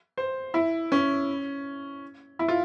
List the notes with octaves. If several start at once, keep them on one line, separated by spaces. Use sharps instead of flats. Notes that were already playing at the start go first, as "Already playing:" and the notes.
C5
E4
C#4
E4
F4